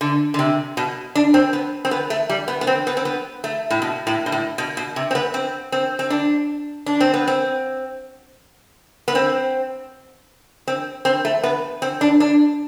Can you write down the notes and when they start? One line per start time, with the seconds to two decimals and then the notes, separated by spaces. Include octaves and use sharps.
0.01 D3
0.34 D3
0.39 C3
0.77 B2
1.15 D4
1.34 C4
1.53 B3
1.85 C4
1.91 B3
2.10 A3
2.29 G3
2.48 B3
2.61 B3
2.67 C4
2.87 B3
2.97 C4
3.05 B3
3.44 A3
3.71 A2
3.82 B2
4.07 A2
4.26 B2
4.32 A2
4.58 B2
4.77 B2
4.96 C3
5.11 C4
5.15 B3
5.34 C4
5.72 C4
5.99 C4
6.10 D4
6.86 D4
7.01 C4
7.14 B3
7.28 C4
9.08 B3
9.15 C4
10.68 C4
11.05 C4
11.25 A3
11.43 B3
11.82 C4
12.01 D4
12.20 D4